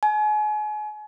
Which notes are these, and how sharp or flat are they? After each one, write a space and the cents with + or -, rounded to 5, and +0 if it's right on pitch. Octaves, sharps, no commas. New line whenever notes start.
G#5 +35